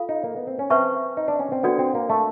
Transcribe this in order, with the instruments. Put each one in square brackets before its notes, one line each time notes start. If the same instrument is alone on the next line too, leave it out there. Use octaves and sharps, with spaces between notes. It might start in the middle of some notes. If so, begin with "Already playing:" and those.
Already playing: [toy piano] F4 A4 F5
[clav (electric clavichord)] D#4
A#3
B3
C4
C#4
[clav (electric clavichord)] C4 [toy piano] B4 E5 A5 C#6
[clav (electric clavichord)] D#4
D4
C#4
C4
[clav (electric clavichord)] B3 [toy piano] D4 F#4 A4 D5 G5
[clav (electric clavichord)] C4
A#3
A3